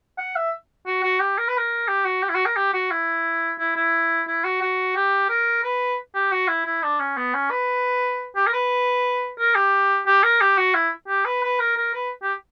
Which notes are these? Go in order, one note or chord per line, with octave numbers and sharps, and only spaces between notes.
F#5
E5
F#4
F#4
G4
A#4
B4
A#4
G4
F#4
G4
E4
F#4
A#4
G4
F#4
E4
E4
E4
E4
F#4
F#4
G4
A#4
B4
G4
F#4
E4
E4
D4
C#4
B3
C#4
B4
G4
A#4
B4
A#4
G4
G4
A#4
G4
F#4
E4
G4
B4
B4
A#4
A#4
B4
G4